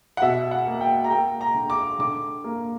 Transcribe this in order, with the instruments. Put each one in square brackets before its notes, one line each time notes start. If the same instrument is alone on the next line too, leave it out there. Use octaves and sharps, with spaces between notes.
[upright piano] F#5
B2 E5
F#5
A#3
G5
A#5
A#3 G5
A#5
D3
D6
D3 D6
A#3